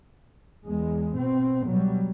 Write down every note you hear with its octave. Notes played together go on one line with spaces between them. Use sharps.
E2 G#3
B2 C4
B2 F#3 G3